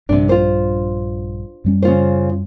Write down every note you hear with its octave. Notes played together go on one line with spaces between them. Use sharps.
A#1 G2 C3 D4
F4 C5
F#2 G3 C#4
C#3 F4 C5